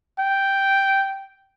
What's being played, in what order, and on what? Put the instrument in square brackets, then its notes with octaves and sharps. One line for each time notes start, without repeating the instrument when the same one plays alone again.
[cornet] G5